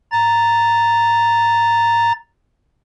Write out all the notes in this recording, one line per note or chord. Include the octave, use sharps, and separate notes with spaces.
A#5 A6